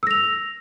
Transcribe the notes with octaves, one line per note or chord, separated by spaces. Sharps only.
E6 A#6 F7